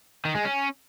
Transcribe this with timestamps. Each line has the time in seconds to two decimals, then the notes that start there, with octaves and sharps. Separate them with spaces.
0.25 D#3
0.35 G#3
0.45 C#4